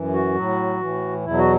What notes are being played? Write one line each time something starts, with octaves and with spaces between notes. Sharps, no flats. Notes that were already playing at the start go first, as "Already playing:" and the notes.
Already playing: F#2 E3
F#4
A2 F#3
A2 E3
E2 B2 F#3 E4
F#4